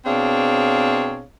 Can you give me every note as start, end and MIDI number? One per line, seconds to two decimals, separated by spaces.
0.06 1.23 47
0.06 1.23 60
0.06 1.23 62
0.06 1.23 68
0.06 1.23 73
0.06 1.23 77